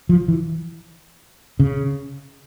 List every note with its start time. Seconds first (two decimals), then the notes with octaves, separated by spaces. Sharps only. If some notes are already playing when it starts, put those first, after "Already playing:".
0.09 F3
0.28 E3
1.60 C#3